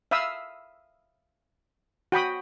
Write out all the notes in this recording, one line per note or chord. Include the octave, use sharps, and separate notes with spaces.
E5 F5 B5 D#6 E6
F#4 G5 B5 D#6